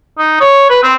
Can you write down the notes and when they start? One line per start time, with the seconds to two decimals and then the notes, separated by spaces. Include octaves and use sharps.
0.18 D#4
0.40 C#5
0.70 B4
0.83 C4